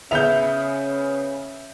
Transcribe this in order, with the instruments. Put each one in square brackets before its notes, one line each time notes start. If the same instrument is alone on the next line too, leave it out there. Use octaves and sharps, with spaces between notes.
[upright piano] C#3 B3 F7 [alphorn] C#4 [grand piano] E5 G6